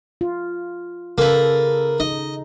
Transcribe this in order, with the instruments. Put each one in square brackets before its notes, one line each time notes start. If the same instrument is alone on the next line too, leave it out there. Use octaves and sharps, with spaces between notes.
[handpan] F4
[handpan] C#3 A4 [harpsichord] A#3 B4
[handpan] D#4 [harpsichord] D#5